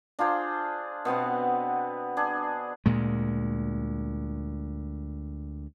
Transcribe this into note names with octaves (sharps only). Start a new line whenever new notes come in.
D4 F4 G#4 C5
B2 B3 C4 F#5
D4 G#4
D2 A#2 G#3